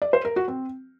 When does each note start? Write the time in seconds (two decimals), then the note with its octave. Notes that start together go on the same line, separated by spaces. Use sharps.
0.02 D5
0.13 C5
0.25 A#4
0.36 F#4
0.48 C4